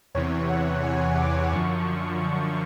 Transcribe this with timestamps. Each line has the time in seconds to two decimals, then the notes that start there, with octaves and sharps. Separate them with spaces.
0.14 E2 C3 E3 C#5
0.49 F#5
0.83 G#5
1.17 D6
1.52 F#2 D3 F3 C#6
1.87 C#6
2.21 C#6